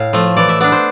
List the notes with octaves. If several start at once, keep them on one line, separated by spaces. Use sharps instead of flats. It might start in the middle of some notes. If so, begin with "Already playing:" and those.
Already playing: A2 F5
F3 A3
E3 D5
E5
B3 D4 D5
C5